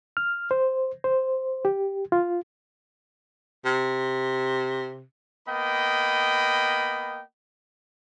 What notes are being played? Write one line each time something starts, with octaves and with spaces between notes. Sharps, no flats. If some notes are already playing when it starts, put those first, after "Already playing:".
F6
C5
C5
G4
F4
C3
A#3 B3 D#5 G5 B5